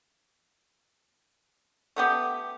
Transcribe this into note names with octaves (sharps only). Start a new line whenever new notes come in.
A3 B3 G4